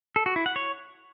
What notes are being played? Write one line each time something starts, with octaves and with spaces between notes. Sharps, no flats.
A4
F#4
E4
F#5
C#5